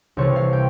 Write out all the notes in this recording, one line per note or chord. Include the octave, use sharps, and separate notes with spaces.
C2 C3 E3 A3 C4 C#5
F5
G5